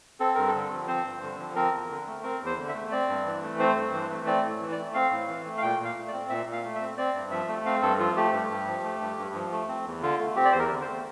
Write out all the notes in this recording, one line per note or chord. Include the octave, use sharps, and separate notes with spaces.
C4 A4
G2 A#4
A4
D3
F3
C4 C5
G2
D3
F3
C4 A#4
E2
D3
A3
C4 A#4
E2
C5
D3
E5
A3
C4 D5
G2
E3
A3
C4 C5
G2
E3
A3
C4 D5
A2
E3
D5
A3
C4 F5
A2
E3
A3
F5
A#2 G5
A#2
F5
A3
D5
C4
A#2 E5
A#2
F5
A3
E5
C4
C4 D5
G2
F3 E5
A3
C4 F5
G2 A4
F3 F4
A3 G4
G2
G2
F3
A3
G2
G2
F3
A3
C4
E2
D3 F4
A3
C4 G4
D5
E2 C5
A#4
D3
C5
A3